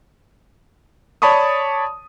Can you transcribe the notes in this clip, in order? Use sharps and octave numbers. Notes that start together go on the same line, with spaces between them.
C#5 D5 A5 B5 C#6 D#6